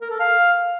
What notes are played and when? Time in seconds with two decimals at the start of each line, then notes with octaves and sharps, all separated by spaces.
0.01 A#4
0.10 A4
0.20 F5